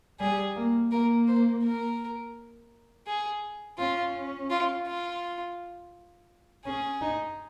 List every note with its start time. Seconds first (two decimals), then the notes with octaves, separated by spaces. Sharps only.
0.20 G3 G#4
0.56 A#3
0.91 A#3 A#4
1.28 C5
1.64 A#4
3.07 G#4
3.78 C#4 F4
4.50 F4
4.86 F4
6.65 C#4 G#4
7.02 D#4